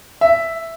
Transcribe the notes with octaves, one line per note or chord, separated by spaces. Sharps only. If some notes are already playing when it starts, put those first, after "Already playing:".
E5